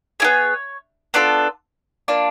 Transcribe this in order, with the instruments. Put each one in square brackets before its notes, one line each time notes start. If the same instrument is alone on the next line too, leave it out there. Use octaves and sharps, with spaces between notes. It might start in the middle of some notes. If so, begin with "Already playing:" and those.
[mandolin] B3 E4 G#4 C#5
B3 D4 F4 A4
A#3 D4 F4